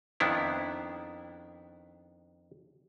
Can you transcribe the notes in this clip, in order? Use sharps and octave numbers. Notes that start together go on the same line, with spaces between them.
F2 D#3 B3 D4 E4